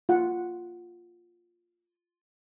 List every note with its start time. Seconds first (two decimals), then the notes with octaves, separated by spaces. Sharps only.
0.09 F4 F#5